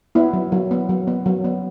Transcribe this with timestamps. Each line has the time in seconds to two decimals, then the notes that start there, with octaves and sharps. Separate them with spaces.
0.15 B3 E4
0.33 F#3
0.52 F#3
0.71 B3
0.89 F#3
1.07 B3
1.26 F#3
1.44 B3